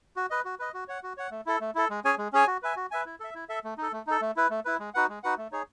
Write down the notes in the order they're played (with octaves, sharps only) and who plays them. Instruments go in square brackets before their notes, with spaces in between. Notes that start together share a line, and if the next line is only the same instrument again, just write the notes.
[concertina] F#4
B4 D#5
F#4
B4 D#5
F#4
C#5 F#5
F#4
C#5 F#5
A3
E4 A4
A3
E4 A4
G#3
C#4 G#4 C#5 G#5
G#3
C#4 G#4 C#5 G#5
F#4
B4 E5 G#5
F#4
B4 E5 G#5
E4
A4 E5
E4
A4 E5
A3
D#4 A4
A3
D#4 A4
A3
E4 B4
A3
E4 B4
G#3
D#4 F#4 B4 F#5
G#3
D#4 F#4 B4 F#5
A3
D#4 G#4 C#5